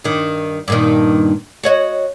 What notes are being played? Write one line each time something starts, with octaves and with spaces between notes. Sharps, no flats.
G2 D#3
G2 A#2 D#3
F#4 C#5 D#5